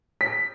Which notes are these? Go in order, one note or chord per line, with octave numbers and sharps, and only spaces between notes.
B6